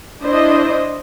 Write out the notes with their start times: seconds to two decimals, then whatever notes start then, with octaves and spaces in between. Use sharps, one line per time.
0.21 D4 E4 C5 D#5